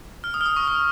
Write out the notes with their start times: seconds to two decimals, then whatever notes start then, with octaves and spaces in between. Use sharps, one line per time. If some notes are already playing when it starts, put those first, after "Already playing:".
0.24 F6
0.34 D#6
0.41 F6
0.46 D#6
0.56 C#6
0.68 D#6